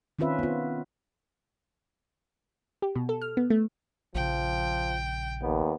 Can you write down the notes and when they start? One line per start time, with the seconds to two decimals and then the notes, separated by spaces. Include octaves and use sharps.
0.19 D#3 C4 C#4 F4 B4 E5
0.39 B3 F4
2.82 G4
2.96 B2
3.09 A4
3.22 F6
3.37 B3
3.50 A3
4.15 A#1 C#3 F3 G5
5.42 D#2 B3